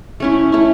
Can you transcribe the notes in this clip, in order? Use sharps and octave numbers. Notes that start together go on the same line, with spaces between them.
A3 C#4 E4
A3 C#4 E4